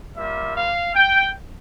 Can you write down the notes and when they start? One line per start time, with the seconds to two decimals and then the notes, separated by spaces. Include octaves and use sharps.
0.15 G3 A#3 F4 E5
0.55 F5
0.94 G5